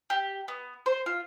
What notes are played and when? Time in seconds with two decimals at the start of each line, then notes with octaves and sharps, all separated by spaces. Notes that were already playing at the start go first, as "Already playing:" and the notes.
0.10 G4
0.48 B3
0.86 C5
1.06 F4